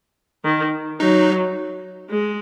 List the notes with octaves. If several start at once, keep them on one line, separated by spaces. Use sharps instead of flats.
D#3
F#3 D#4
G#3